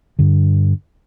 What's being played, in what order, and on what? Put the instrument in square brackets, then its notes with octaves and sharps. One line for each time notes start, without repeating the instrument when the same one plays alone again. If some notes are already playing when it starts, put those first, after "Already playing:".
[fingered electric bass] G2 D3